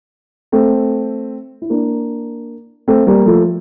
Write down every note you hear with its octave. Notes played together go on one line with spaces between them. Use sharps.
A3 C4
E4
A#3 D4
A3 C4
G3 A#3
F3 A3